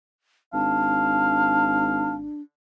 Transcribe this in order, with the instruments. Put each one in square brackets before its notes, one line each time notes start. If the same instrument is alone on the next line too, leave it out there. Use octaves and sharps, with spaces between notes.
[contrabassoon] G#1 [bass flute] D4 [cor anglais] F5 [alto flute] A5